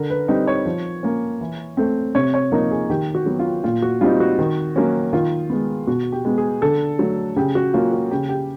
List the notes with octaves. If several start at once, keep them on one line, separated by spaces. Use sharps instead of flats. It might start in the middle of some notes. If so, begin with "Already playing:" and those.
Already playing: D3 A#4
B4
G3 C4 D#4
C#5
F3
A#3 C#4
E3
A3 C4
C3 C#5
C#5
F3 A#3 D#4 A#4
G#4
D#3 G4
F#4
F#3 B3
F4
A#2 F4
F#4
G3 C4 D#4 F4
F#4
D#3
F#3 A#3 C#4
D#3 F4
G#3 B3
B2 F#4
G4
G#3 B3
G#4
D3 A4
F#3 A3
C#3 G4
F#4
F#3 A#3 C#4 F4
F#4
C#3 G4
G4